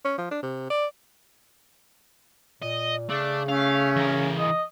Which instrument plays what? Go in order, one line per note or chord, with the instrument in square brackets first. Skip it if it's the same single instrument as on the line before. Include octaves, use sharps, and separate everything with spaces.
[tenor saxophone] C#4
F3
D4
C3
D5
[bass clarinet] A#2 [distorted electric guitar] D#5
[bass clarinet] C#3 [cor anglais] A3 [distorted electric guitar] D4
[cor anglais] A3 [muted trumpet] C#4 [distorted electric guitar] F5
[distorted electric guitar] E3 A#4
[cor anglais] D#5